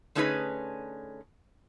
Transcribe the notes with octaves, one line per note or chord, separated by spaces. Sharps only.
D3 A3 C#4 D#4 G#4 B4